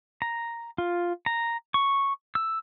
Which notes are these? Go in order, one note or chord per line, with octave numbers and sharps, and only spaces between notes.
A#5
F4
A#5
C#6
E6